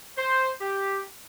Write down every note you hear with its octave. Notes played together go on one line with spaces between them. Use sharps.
C5
G4